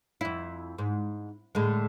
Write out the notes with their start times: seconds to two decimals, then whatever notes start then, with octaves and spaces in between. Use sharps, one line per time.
0.21 F2 E4
0.78 G#2
1.55 A2 D3 G#3